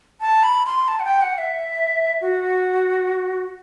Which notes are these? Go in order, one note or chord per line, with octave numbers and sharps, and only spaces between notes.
A5
B5
C6
A5
F#5
G5
F#5
E5
F#4